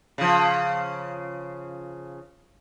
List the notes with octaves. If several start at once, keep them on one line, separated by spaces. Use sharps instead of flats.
C#3 F3